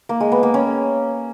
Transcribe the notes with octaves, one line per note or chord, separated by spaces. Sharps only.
A#3
G#3
B3
A#3
C#4